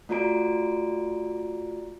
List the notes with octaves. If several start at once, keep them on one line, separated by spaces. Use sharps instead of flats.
A3 F4 F#4 D5 A#5 D7